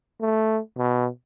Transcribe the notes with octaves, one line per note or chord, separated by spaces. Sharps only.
A3
B2